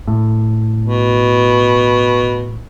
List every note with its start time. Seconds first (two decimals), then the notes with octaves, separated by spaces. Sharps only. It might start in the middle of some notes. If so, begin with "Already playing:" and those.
0.08 A2
0.84 B2